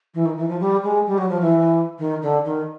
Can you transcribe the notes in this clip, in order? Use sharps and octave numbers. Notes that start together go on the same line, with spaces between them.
E3
D#3
E3
F3
G3
G#3
G3
F#3
F3
E3
D#3
D3
D#3